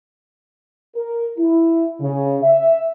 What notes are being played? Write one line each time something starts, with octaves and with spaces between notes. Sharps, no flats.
A#4
E4
C#3
E5